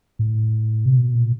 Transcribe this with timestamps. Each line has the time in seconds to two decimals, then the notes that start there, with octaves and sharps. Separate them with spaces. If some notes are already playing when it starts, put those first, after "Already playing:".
0.19 A2
0.85 C3
0.95 B2
1.15 A#2